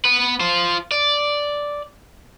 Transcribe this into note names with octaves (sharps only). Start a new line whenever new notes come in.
B3 B4
F4 C5
D5